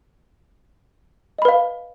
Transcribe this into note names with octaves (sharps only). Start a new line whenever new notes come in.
B4 D#5 F5 B5